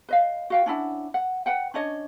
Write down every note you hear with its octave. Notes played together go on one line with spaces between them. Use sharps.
B4 D#5 F5
F#4 F5 G5
C#4 D4 E4 F#5
F#5
B4 F#5 G5
C#4 D4 C#5 D#5